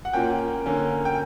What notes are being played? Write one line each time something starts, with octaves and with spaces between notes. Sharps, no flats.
F#5
A#2 A#3 C#4 G5
D3 A#3 C#4
G5